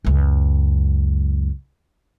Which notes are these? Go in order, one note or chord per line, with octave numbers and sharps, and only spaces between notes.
C#2 F#2